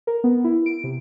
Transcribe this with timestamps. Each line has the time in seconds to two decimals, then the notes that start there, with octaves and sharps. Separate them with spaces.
0.07 A#4
0.24 B3
0.44 E4
0.66 D7
0.84 C3